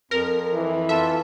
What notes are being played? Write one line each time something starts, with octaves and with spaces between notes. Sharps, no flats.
F2 A#4
E3
F4 A4 E5